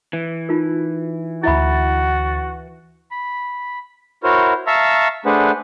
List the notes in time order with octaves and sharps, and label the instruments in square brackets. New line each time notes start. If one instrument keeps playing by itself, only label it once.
[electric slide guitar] E3
[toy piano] D#4 F4 A#4
[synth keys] D2 A6 [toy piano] E4 E5 B5 [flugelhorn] F#4
[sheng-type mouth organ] B5
E4 F#4 A#4 C5 C#5
E5 F5 A5 A#5 C#6 E6
A3 D4 G#4 B4 C5 F#5